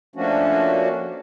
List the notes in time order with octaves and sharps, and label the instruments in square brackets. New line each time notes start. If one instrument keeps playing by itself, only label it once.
[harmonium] F3 A3 A#3 C#4 D4 F#4